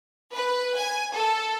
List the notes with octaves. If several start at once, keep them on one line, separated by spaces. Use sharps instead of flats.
B4
G#5
A4